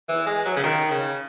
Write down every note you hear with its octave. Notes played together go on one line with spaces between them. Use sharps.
E3
G#3
F#3
C#3
D#3
C#3